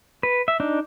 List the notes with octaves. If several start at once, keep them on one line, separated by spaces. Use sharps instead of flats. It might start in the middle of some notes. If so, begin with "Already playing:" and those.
B4
E5
D4 D#4